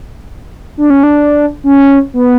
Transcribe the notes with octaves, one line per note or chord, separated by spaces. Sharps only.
D4
C#4
D4
C#4
B3